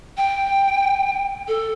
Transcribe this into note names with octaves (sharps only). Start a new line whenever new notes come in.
G5
A4